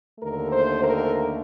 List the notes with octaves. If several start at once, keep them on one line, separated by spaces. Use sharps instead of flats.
D#2 D3 A3 A#4
C5
A#4